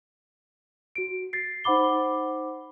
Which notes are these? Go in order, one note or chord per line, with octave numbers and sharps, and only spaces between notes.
F#4 D7
A6 C7
D#4 C5 F#5 B5 D6 G7